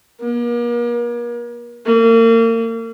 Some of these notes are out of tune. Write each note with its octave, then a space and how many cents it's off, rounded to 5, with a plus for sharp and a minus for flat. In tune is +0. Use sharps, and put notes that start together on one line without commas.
A#3 +40
A#3 -35